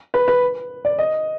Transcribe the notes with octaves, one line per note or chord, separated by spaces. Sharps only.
B4
B4
D5
D#5